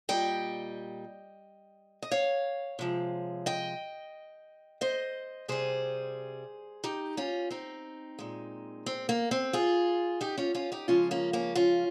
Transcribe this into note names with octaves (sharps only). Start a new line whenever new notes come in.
A#2 G3 D#5 G5
D#5
C#5 F5
C3 F3 G#3
D#5 G5
C5 D#5
C3 G3 G#4 C5
D#4 G4
C#4 F4
C4 D#4
A#2 G#3
C4
A#3
C4
F4 G#4
D#4 G4
C#4 F4
C#4 F4
D#4 G4
C#3 F3 G#3 C#4 F4
A#3 C#4
A#3 C#4
C#4 F4